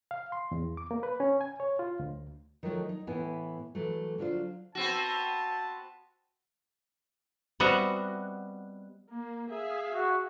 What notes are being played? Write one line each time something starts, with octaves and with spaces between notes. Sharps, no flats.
F5
C6
E2
D6
A#3
B4
C#4
G#5
C#5
F4
D2
D#3 F3 F#3 A3
D#4
A2 E3 B3 E4 G#5
E3 F#3 A3
D3 F#3 D4 F4 C5
B3 C4 F#4 A5
G3 B3 C4 F#4 D#5 E5
A#3
G#4 E5 F5
F#4